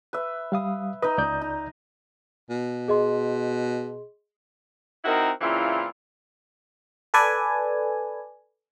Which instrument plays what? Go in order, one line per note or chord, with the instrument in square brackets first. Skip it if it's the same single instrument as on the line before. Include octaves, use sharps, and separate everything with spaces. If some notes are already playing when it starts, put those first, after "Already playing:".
[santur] B4 E5
[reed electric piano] G3 F5 D#6
[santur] D#4 D#5 [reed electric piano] B4
[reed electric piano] C#2 D5 G6
[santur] D#4
[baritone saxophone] B2
[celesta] G#4 D#5 C6
[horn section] C4 D#4 E4 F#4 A#4
A#2 C#3 E3 C4 E4 F4
[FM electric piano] A4 B4 D5 G#5